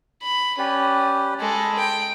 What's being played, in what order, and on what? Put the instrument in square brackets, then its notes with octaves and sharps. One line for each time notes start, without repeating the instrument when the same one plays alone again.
[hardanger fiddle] B5
[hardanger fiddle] C#4 [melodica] G4 B4 D5
[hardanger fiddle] G#3 A4 [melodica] B5
[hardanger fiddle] G5